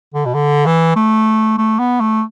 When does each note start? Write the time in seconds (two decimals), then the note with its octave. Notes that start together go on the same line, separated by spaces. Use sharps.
0.14 D3
0.26 B2
0.34 D3
0.66 E3
0.96 A3
1.58 A3
1.79 B3
2.00 A3